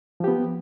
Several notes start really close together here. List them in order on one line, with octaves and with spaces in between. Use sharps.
F3 G4 B3